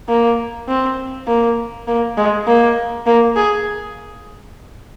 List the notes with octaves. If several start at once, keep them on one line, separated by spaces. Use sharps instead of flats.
A#3
C4
A#3
A#3
G#3
A#3
A#3
G#4